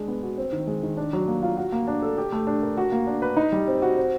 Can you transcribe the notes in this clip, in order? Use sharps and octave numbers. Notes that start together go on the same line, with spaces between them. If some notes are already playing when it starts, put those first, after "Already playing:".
Already playing: G#3 D4
B3
F#4
C4
D#3
G#3
D#3
D4
F#3
A#3
F4
F#4
A#3
D4
A4
G4
A3
D4
A#4
F#4
A#3
D4
B4
D#4
G3
C4
F#4
C4